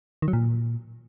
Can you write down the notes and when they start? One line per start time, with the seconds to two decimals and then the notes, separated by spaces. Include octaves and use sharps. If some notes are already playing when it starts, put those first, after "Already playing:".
0.22 D#3
0.28 F#3
0.33 A#2